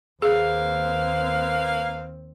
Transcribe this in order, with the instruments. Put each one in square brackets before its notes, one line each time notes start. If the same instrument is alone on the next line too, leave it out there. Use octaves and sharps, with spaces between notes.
[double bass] D#2 C4 [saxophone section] A#3 B4 F5 [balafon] G#4